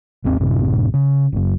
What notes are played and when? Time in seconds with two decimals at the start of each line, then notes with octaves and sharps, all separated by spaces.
0.24 G#1 D#2 C4
0.40 A1 F#2 A2 C3
0.94 C#3
1.32 F#1 F#2